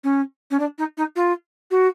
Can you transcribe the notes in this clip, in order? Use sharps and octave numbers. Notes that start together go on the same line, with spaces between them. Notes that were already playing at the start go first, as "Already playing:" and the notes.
C#4
C#4
D4
D#4
D#4
F4
F#4